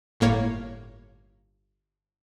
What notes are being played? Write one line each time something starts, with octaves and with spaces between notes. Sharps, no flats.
G1 A2 A#3 C#5